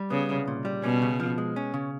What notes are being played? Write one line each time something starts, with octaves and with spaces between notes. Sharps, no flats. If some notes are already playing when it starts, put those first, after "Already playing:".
Already playing: G3
C#3 B3
C2
A#2
G3
B2 C#4
C#3
F3
G#3
C#4
C#3